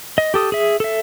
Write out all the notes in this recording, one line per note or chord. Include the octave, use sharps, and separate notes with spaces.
D#5
G4 A4 D#6
G#4 E5
A4 E5